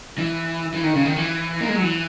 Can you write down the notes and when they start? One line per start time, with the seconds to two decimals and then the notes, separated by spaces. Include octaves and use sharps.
0.18 E3
0.74 E3
0.83 D#3
0.95 C#3
1.06 D#3
1.17 E3
1.61 A#3
1.68 G#3
1.75 F#3
1.82 E3